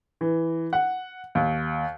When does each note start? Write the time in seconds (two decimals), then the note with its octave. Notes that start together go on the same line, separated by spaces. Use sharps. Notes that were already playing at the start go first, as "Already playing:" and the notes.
0.21 E3
0.73 F#5
1.35 D#2